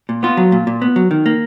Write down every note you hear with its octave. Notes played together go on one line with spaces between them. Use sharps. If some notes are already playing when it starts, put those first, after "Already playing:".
A#2
B3 F4
F#3
A#2
A#2
B3
F#3
D#3
A#3